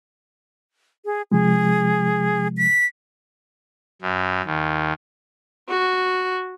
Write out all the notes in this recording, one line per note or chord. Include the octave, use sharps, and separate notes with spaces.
G#4
C3 F3 G#3 G#4
B6
F#2
D#2
F#4